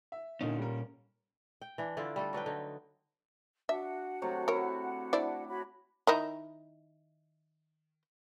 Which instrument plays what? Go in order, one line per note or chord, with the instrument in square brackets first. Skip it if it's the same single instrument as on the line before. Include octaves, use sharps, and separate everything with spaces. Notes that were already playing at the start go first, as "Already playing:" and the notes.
[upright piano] E5
[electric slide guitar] A#2 C#4 [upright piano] D3 A#3 D#4
[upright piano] G3 A#4
[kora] G5
E3 D4
D3 E4 F4 D5
G3 A3 A4
F#3 D4 B4 G5
D3 D#4
[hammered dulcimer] D4 [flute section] F#4 F#5 [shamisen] E5
[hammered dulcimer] C3 F#3 A3
[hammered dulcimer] E4 [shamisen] A#4 C#5
[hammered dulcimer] D4 [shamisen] E4 C5 D5
[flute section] F#4 C#5 B5
[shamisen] D#3 D#4 E4